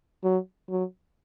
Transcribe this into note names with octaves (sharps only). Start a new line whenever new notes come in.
F#3
F#3